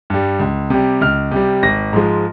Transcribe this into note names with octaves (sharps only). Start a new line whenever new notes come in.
G2 G3
C#2
C3 G3
C#2 F6
C3 G3
G#1 A#6
G#2 F3 G#3